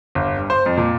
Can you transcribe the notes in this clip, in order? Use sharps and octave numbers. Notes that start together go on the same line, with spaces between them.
G1
G2
C5
F2
A#2